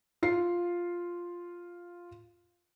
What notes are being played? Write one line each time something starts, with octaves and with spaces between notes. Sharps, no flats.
F4 F5 C7